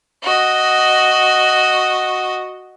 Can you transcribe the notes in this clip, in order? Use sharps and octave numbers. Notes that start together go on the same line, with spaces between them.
F#4 D#5